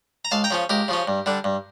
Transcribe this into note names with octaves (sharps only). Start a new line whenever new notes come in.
A#5
C#2 F5 A5
G5 A#5
C#3 F3 C#4
C#2 G4 A#4
C#3 F3 C#4
G2
D3 G3 D4
G2